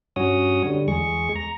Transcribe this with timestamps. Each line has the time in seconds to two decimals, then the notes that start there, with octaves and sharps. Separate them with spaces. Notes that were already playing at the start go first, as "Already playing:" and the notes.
0.16 G2 C#4 F#4 C#5 D#6
0.65 D3 G3
0.88 E2 G#3 G#4 C#6
1.36 A#5